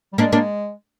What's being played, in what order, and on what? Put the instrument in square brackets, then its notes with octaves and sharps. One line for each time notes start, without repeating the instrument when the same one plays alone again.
[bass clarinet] G3
[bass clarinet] G#3 [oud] A#3 D4
[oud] A#3 D4